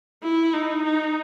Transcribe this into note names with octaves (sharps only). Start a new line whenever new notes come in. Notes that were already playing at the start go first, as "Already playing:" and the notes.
E4
D#4
D#4